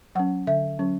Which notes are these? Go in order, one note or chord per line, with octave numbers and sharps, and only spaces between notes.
F#3 C#4 F#5
D3 E5
F#3 C#4